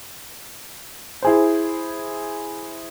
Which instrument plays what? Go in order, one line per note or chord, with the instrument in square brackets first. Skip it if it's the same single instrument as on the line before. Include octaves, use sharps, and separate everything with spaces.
[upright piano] E4 G#4 C5